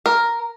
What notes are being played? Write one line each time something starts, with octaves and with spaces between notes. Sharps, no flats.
A#4